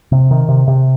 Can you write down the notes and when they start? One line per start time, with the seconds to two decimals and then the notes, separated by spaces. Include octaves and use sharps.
0.12 C3
0.31 D#3
0.49 C3
0.68 C3